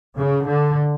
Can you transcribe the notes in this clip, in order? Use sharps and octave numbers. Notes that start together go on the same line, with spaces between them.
C#3
D3